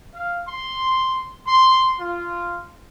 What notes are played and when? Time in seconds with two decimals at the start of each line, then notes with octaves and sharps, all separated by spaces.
0.15 F5
0.47 C6
1.47 C6
2.00 F4